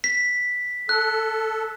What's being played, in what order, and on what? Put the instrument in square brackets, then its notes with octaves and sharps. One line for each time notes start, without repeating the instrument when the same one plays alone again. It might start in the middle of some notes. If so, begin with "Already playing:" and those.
[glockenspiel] B6
[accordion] A4 [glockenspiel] F#6